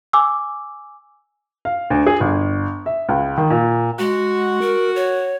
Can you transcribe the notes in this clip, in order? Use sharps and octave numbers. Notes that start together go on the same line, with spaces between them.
G#5 D6 E6
F5
D2
G#4
G1
E5
C#2
D#3
A#2
G#3 F#4
A#4
C#5